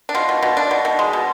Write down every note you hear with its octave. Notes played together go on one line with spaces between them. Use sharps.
D4
B2 F4
B2
B2
D4
B2
B2
G#3
B2